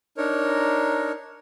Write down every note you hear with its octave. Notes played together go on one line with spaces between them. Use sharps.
D4 D#4 A#4 C#5